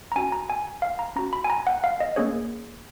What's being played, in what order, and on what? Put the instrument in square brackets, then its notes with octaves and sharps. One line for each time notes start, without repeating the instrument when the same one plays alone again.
[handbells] A#5
C#4 F#4 G#5
A#5
G#5
F5
A#5
C#4 F#4 A#5
B5
G#5
A#5
F#5
F5
D#5
A#3 C#4 G#4 C#5